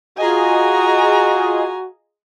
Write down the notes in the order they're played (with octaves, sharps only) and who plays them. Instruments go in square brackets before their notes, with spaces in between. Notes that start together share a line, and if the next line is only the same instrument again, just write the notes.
[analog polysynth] F4 G#4 D#5 [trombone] F#4 [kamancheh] G#5 A#5